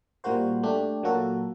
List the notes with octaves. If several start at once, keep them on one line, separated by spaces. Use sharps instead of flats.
A#2 G3 A#3 F#4 C5
A3 D4 G4
A#2 F#3 A#3 F#4 A4